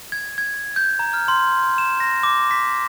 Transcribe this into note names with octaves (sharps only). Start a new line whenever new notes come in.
G#6
G#6
G6
A#5
F6
C6
E7
A#6
D6
B6